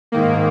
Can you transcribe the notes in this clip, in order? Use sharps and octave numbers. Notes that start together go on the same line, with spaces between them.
G#2 D#3 A#3